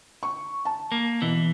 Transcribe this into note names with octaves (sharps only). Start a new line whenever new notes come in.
C#6
A5
A#3
B2 E3